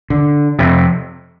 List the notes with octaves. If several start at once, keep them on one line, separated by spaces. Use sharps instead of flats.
D3
F2 C3